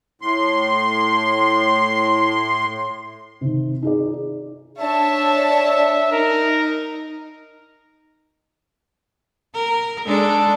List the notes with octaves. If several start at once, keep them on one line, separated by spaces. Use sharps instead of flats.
A2 C6
C3 D#3
D#4 G#4 D5
D4 C#5 E5 A5
D#4 A#4
A#4
G#3 D4 A4